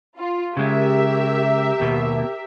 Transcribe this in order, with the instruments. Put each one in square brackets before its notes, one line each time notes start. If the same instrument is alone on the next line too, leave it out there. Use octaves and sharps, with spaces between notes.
[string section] F4
[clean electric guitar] C#3 G#3 [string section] G4 A#4 E5
[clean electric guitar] D#2 B2